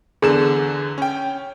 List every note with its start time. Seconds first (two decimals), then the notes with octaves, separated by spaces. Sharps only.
0.22 E2 D3 G#4 E7
0.98 C#4 G5